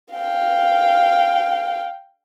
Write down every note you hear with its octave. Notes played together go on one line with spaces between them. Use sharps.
F5 G5